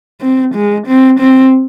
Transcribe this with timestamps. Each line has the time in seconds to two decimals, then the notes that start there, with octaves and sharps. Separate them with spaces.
0.21 C4
0.54 G#3
0.87 C4
1.20 C4